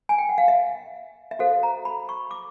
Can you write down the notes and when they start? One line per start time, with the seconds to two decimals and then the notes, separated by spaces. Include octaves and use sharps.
0.09 G#5
0.18 G5
0.29 F#5
0.38 F5
0.48 E5
1.31 E5
1.39 F#4 A4 C5 F5
1.63 A#5
1.85 B5
2.09 C#6
2.31 D6